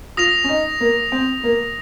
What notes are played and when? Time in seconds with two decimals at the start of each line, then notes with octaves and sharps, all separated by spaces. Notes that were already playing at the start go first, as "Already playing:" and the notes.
0.17 F4 D#6 A#6 F7
0.44 C#4
0.49 D#4
0.80 A#3
1.12 C4
1.44 A#3